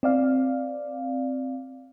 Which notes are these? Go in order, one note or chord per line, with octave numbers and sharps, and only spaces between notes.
C4 D5 F5